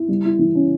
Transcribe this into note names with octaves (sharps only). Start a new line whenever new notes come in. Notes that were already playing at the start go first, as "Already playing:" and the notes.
Already playing: E4
G3
E4
E3
C#4